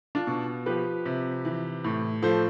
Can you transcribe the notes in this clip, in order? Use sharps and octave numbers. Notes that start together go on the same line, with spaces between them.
D4 F4
B2
F3 G4 B4
C3
E3
A2
F3 A4 C5